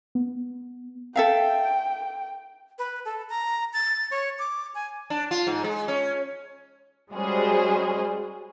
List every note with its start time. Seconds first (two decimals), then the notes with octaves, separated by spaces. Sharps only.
0.15 B3
1.16 A4 E5 F5 G5
2.79 B4
3.05 A4
3.29 A#5
3.73 A6
4.11 C#5
4.39 D6
4.75 G#5
5.10 D4
5.31 F4
5.47 G#2
5.64 G#3
5.88 C#4
7.12 G3 G#3 C#4 F#4 G#4 C5